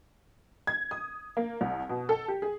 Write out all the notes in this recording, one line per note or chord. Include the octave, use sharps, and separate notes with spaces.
G#6
D#6
A#3
C2
B2
A4
G4
G#4